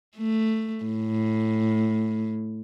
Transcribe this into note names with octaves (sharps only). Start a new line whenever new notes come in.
A3
A2